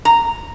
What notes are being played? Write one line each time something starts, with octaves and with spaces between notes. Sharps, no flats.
A#5